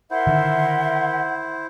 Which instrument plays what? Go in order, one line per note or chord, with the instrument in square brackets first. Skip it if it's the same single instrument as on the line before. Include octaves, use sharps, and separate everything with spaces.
[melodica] E4 C5 [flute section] A#4 E5 C6 [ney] F#5
[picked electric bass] D3 D#3